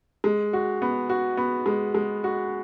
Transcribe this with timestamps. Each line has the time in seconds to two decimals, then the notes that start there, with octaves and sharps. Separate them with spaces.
0.24 G#3
0.53 F#4
0.82 B3
1.09 F#4
1.37 B3
1.66 G#3
1.95 G#3
2.24 F#4